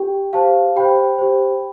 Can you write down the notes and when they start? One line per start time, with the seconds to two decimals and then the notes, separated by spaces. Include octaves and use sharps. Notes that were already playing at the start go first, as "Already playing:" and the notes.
Already playing: G4 G5
0.33 G4 C5 F5 A5
0.76 G4 C5 G5 B5
1.18 G4 C5